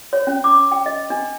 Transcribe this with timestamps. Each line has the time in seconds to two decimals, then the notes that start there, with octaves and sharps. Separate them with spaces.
0.13 C#5
0.27 C#4
0.44 D6
0.72 G5
0.86 D#5
1.10 D4